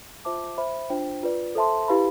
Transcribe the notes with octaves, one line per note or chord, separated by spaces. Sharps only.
F4 C5 E5 A5 D6
C5 E5 B5
D4 F4 C5 G5
F4 B4 D5
A4 C5 E5 A5 C6
E4 G4 B4 F5 B5